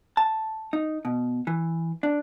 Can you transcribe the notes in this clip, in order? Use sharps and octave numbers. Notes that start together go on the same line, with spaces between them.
A5
D#4
B2
E3
D4